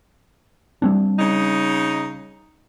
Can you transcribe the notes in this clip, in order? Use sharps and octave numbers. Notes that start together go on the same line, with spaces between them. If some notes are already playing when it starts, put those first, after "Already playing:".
G3 C4 D4
C#3 D#4